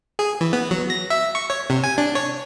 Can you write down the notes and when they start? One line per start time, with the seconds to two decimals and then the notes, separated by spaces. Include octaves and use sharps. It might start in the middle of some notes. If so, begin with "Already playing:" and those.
0.19 G#4
0.41 E3
0.53 B3
0.71 F#3
0.90 A#6
1.10 E5
1.35 C#6
1.50 C#5
1.70 C3
1.84 G#5
1.98 D4
2.15 C#5